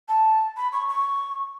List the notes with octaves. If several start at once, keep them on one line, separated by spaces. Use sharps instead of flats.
A5
B5
C#6
C#6